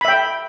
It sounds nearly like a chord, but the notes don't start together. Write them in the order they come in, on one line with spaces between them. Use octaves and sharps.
B5 E5 G5